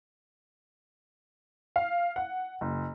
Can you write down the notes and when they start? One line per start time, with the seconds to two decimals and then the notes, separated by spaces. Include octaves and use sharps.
1.76 F5
2.16 F#5
2.61 F#1